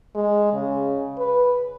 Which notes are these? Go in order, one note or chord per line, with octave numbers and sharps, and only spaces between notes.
G#3
C#3
B4